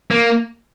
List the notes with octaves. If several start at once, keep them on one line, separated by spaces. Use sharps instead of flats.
A#3